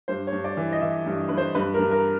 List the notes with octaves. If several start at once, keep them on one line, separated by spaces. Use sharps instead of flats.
G2 C5
C#5
G2
D5
E3
D#5
E3 E5
G2
G2 B4
C5
G2 B4
G2 A#4
A#4